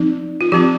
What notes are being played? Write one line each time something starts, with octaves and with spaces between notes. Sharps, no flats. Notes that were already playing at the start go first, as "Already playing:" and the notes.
Already playing: F3 C4 D#4
F4
F3 C4 F4 G4